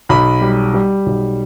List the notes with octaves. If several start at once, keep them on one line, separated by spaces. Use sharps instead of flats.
B1 B5
G3
G3
B1